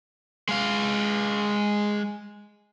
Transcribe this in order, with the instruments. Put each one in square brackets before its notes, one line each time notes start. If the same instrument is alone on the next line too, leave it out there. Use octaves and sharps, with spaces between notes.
[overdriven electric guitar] G#3 F5